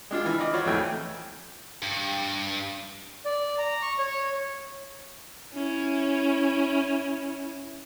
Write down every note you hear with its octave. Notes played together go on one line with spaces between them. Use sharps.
G#3 D4 F4
E3 F6
D#5 B5 D6
F4 F#4 C#5 D5
A#1 F2 E3 A3 G5 G#5
G2
D5
A#5
C#6
C#5
C#4 E4